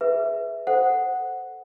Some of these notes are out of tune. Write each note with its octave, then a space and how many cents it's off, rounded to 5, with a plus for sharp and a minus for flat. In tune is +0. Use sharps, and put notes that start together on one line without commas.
G#4 +10 B4 +0 E5 +0
A4 +0 C5 +0 F#5 +0